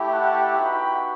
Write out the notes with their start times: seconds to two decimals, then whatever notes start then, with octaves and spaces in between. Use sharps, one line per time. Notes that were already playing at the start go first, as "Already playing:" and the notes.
Already playing: A3 E4 G4
0.11 F#5 A5
0.57 B3 D#4 F#4 G5 B5